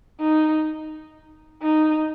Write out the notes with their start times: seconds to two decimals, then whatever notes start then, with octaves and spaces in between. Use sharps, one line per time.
0.20 D#4
1.62 D#4